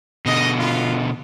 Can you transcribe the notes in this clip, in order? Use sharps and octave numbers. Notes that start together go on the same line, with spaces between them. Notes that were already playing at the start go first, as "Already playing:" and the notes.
B2 D3 D#5
B3 F4